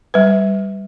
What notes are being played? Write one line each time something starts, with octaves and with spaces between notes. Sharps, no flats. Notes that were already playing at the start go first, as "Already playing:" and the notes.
G3 B4